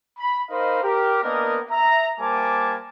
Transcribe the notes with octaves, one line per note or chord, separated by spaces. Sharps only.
B5
D#4 A#4 C5 D#5 F5 B5
G4 A#4
A#3 B3 D4 A#4 D#5
E5 A#5
G3 A#3 C5 G#5 A5 D6